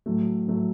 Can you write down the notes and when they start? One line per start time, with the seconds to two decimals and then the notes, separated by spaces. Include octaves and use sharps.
0.06 A2 F#3 A3
0.47 A2 F#3 A3